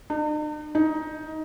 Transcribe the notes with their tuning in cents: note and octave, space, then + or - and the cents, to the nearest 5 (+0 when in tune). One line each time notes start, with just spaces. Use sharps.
D#4 -45
D#4 +15